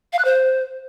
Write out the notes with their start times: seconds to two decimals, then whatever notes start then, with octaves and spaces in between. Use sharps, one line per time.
0.13 F5
0.19 F#6
0.25 C5